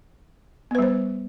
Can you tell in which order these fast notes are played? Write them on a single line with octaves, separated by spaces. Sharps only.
B3 B4 G3 C5